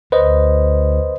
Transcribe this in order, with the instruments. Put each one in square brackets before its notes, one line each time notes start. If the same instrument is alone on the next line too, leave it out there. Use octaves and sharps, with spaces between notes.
[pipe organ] D2 [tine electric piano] B4 C5 D#5